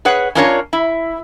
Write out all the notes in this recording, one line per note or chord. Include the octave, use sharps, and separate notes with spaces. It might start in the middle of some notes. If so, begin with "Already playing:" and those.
G#4 B4 C#5 F#5
C#4 D4 F4 A#4 B4 C#5
E4